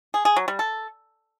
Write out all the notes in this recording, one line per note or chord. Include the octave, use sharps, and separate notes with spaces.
G#4
G#4
F#3
G3
A4